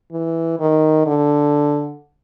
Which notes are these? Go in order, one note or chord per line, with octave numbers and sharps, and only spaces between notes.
E3
D#3
D3